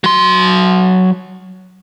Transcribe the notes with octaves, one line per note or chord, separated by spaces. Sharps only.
F#3 C6